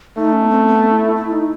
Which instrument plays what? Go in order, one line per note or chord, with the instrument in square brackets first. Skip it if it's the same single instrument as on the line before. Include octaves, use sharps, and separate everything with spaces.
[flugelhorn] A3 [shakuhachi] D#4
[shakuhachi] C#4
B3
C4
B3
E4
E4
D#4